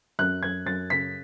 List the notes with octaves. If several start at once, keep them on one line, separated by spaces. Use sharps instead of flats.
F#2 F#6
F#2 G#6
F#2 A6
C#3 B6